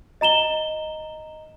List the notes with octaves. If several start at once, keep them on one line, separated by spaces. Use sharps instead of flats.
D#5 A#5 E7 G7